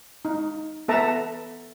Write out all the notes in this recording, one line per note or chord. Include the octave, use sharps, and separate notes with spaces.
D#4
B3 A4 E5 A5 A#5